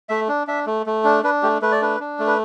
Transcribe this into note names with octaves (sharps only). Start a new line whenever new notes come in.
A3 E5
D4
D4 E5
A3
A3
D4
D4 B4
A3 G4
A3 B4
D5
D4 B4
D4
A3
B4